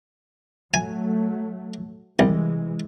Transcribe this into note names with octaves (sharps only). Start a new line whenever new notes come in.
F#3 A3 G#5
C2 C3 E3 G#3